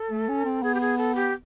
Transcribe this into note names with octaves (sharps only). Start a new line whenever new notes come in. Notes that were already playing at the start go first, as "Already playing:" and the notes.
Already playing: A4
A3
C#4
C4
B3 G#4
G4
G#4
A4
G4